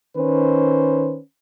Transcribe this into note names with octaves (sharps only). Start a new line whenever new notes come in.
D#3 C#4 B4 C5